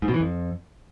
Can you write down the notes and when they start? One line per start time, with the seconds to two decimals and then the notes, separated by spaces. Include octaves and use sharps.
0.02 G#2
0.08 B2
0.14 E3
0.20 F2